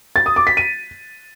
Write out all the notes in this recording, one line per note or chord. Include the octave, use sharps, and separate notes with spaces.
A6
D#6
D6
B6
D#7